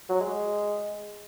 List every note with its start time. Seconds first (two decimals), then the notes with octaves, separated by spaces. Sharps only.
0.09 F#3
0.20 G#3